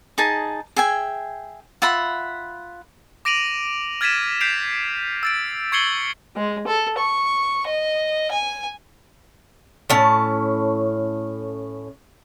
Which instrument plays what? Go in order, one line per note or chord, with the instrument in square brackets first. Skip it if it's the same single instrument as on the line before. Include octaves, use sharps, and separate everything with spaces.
[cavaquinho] D#4 G#4 A5
G#4 E5 G5 G#5
F4 E5 F#5 B5
[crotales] D6 A#6 D7 D#7 F7 F#7
F6 G#6 A6 B6 D#7 E7
G6 B6 C7 D7 F7
E6 A6 D7
C#6 G#6 C7 C#7 F#7 G7
[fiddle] G#3
A4
C#6
D#5
G#5
[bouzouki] A2 C#4 A5